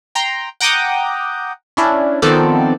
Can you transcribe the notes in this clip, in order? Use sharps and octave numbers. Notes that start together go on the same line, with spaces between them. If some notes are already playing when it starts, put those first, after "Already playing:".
G5 A#5 C6
F#5 G5 A#5 D6 D#6 G6
C#4 D4 E4
D#3 F3 B3 C4 A4 D5